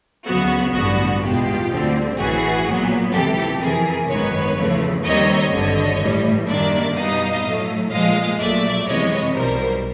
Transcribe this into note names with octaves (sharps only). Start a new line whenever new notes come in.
D2 C#3 F#3 B3 F#4
A1 G2 D3 G3 B3 F#4
E2 B2 G#3 B3 F4 G4
D2 D3 G3 C4
A1 A2 E3 F#4 G#4
A#2 F#3 B3
C#2 C3 E3 G4 A4
F2 C3 E3 G#4 A#4
G#1 F#2 D#3 G#3 B3 B4 C#5
E2 C#3 F3 A3
D#2 D#3 G3 C4 C#5 D#5
G#1 G2 D3 C#5 D#5
A2 E3 G3
F#2 D#3 G3 A#3 D4 D5 E5
B2 G3 B3 D#4 D#5 F5
A2 F#3 A3
A#2 F3 G#3 D#5 F5
A#1 A#2 F#3 A3 D5 E5
F2 C3 E3 G#3 B3 C#5 D#5
B1 B2 G3 A#4 C5